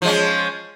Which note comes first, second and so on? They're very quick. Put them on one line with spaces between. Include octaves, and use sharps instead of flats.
F3 G#3 C#4